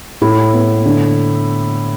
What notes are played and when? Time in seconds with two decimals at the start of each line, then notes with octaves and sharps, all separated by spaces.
0.22 A2 E4
0.53 B3
0.85 D3